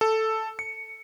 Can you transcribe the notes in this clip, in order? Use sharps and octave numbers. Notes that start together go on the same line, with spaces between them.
A4
C#7